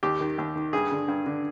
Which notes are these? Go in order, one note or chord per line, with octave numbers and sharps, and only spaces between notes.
D#2 G4
D#3
D#2
D#3
G2 G#4
D3
G2
D3